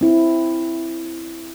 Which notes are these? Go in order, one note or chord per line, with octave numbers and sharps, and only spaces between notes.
C4 E4